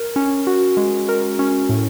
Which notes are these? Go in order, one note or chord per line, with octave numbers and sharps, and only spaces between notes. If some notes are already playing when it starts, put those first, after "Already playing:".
Already playing: A#4
C#4
F#4
G#3
A#4
C#4
A2